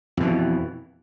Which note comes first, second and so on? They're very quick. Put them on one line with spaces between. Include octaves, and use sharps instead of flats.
F2 B2 E3